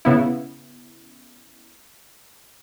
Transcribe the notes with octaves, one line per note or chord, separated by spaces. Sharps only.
C#3 B3 E4